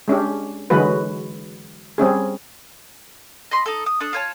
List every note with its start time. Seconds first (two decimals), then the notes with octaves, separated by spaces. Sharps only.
0.08 G#3 C#4 D4 G4
0.70 D3 E3 F#3 G#3 F#4 B4
1.98 G3 C4 C#4 G#4
3.51 D#5 B5 C6
3.66 D#4 A4
3.86 D#6
4.00 D4 A4 D#6
4.13 F4 C#5 A5